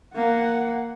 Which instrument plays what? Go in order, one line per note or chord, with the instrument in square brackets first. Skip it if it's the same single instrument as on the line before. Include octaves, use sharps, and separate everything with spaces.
[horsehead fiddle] A#3 F#5